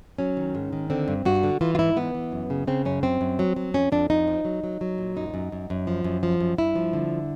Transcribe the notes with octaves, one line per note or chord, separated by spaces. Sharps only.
F#3 C#4
D#3
G#2
D#3
D3 C4
G2
G2 F#4
D3
E3 F4
F4
G#2 E4
E3 B3
E3
F#2
C#3
C#3 C4
F#2 C#4
F#2 C4
F#2
F#3
F#3
F2 C#4
F2 D4
F2 D#4
F3
F#3
F#3
F#3
A#2
F#2 D#4
F#2
F#2
F#2
F3
F#2
F3
F#2
G2 E4
F3
D3